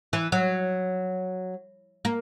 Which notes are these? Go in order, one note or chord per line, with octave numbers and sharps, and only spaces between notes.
E3
F#3
A#3